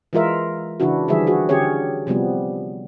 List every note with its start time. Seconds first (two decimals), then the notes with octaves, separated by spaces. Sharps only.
0.13 E3 G#3 F4 A#4 E5
0.80 C#3 E3 D4 E4 F#4
1.08 D3 E3 F3 G3 G#4 E5
1.27 F#4 G#4
1.49 D3 C#4 G4 G#4 C#5
2.07 C3 F3 G3 B3